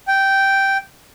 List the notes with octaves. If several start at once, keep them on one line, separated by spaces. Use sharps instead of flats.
G5